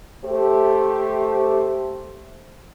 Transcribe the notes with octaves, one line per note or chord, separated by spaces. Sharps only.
A3 G4 C5